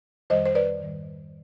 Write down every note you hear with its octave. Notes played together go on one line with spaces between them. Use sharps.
F2 D#3 G3 C5 D#5
C5
B4 D5
G#2 D#3 G3